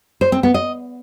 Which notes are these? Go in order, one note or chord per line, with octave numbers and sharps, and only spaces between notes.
C5
C4
B3
D#5